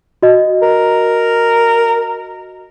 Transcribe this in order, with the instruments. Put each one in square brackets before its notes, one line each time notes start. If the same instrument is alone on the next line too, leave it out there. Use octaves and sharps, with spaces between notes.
[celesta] F#4 D#5
[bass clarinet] A#4